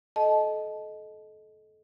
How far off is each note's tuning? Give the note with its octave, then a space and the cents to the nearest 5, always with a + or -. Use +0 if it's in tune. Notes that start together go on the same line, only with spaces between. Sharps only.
A4 -30 D#5 +0 A5 -20